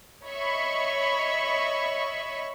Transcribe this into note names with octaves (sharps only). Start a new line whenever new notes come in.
C#5 D#5 E5 B5 C#6